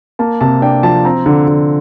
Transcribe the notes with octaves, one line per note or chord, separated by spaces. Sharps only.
A#3 A5
C3 A5
D4 G5
F3 A5
C4 A#5
D3
D3